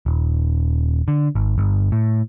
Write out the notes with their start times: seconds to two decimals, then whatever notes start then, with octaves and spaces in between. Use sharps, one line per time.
0.06 D#1
1.08 D3
1.35 G#1
1.58 G1
1.92 A2